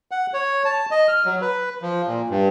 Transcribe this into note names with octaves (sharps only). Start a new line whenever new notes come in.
F#5
C#5
A5
D#5
F6
F#3
B4
F3
A#2
G2